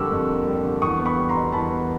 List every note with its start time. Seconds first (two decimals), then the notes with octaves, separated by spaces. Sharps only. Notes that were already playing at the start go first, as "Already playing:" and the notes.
Already playing: F2 D3 G3 A#3 C#6 D6 E6
0.11 F2
0.29 A#3
0.47 G3
0.65 D3
0.82 E2 C#6 D#6
0.99 B3
1.06 B5 C#6
1.17 G3
1.29 A#5 C6
1.36 B2
1.52 E2 A5 B5
1.71 B3